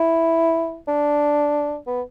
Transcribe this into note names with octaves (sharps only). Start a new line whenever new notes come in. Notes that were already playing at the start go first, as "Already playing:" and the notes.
Already playing: E4
D4
B3